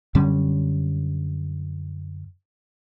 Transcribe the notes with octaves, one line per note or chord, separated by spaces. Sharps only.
F#2 D3 G3 C#4